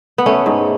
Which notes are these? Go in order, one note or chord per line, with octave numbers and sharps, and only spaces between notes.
B3
A3 C#4
G#2